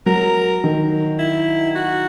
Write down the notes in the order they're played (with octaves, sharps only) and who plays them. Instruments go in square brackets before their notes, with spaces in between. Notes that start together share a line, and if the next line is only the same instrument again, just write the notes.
[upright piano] F#3 [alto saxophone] A#4
[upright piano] D#3
[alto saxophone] E4
F#4